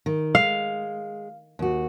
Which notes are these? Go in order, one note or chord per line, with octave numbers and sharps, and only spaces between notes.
D#3
G#3 F5
D#2 F#4